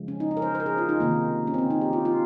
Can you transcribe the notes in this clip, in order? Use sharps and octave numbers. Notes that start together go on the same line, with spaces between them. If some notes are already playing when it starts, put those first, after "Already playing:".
Already playing: C#3 F3 G#3
C#4
D#4
C#4
A#4
C5
A#4 C5
G#4
F4
D#4
C3 D#3 A#3
C#4
C4
C#4
D#4
G4
F4
F4